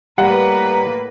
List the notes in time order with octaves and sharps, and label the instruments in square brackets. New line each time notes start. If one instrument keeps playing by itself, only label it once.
[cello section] A2 A#3 B4 [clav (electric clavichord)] G3 [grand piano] F#5 [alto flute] A#5